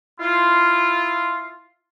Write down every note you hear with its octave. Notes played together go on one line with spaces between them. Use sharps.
E4 F4